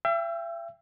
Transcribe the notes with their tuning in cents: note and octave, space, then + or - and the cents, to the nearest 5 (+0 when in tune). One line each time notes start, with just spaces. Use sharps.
E5 +40 G5 +10 E6 +0